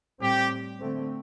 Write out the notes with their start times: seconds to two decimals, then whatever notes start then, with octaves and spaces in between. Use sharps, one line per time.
0.21 A2 G3 C4 G4
0.80 D3 A3 C4